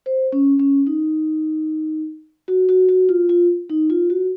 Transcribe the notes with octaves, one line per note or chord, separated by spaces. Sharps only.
C5
C#4
C#4
D#4
F#4
F#4
F#4
F4
F4
D#4
F4
F#4